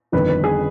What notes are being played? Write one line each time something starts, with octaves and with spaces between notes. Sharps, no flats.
G1 F2 D#3 B4
B4
G#4